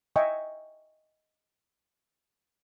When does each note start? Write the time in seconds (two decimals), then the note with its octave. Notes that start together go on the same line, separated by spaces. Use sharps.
0.16 D#5 E5 G5 G#5 C#6